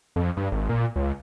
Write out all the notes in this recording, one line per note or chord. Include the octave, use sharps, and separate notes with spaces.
F2
G2
G#1
A#2
C#2